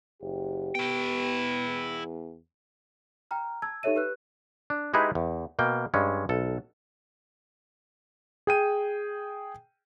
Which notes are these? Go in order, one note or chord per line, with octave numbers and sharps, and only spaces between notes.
F#1 G4
B3 E4 G5
E2
G5 A#5 F6
A5 E6 G#6
D#4 G4 A4 C#5 E5 D#7
G4 B4 F#6
D4
G#3 D#4 E4 G4 G#4 B4
E2
B2 A#3 G5
G2 G#3 C#4
B1 A4
G#4 G5 D#7